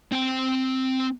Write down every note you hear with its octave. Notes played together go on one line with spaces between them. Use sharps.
C4 G5